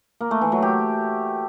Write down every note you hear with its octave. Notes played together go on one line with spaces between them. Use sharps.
A#3
A3
E3
F#3
G4